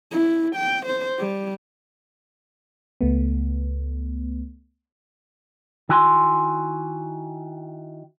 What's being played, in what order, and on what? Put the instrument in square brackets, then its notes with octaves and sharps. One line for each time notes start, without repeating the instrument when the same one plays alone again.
[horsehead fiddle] E4
G5
C5
G3
[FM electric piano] C#2 A3 B3
[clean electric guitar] D#3 E4 F#4 G#5 B5 C6